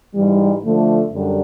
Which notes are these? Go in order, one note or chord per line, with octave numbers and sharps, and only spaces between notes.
G#2 E3 G3
D3 F3 A3
F#2 D3 G3